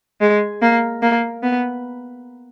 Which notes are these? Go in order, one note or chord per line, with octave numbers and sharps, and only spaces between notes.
G#3
A#3
A#3
B3